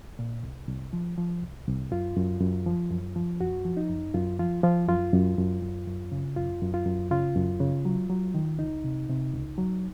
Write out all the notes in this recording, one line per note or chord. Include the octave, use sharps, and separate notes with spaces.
A#2
C2
C2
F3
F3
C2
C2
F#2 F4
F#2
F#2
F3
F#2
F3
F#2 F#4
F3
D#4
F#2
F#2 F4
F3 F4
F3 F4
F#2 F4
F#2
F#2
F#2
F#2
C#3
F#2 F4
F#2
F4
F#2
C#3 F4
F#2
C#3
F#3
F#3
D#3
C#2 D#4
C3
C3
C#2
F#3